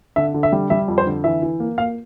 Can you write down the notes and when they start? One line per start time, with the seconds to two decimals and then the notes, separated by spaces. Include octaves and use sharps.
0.16 D3 E5
0.34 D3
0.43 E5
0.52 G3
0.70 G3 E5
0.88 F2
0.98 C5
1.06 D3
1.24 E3 E5
1.42 E3
1.60 A#3
1.78 A#3 F5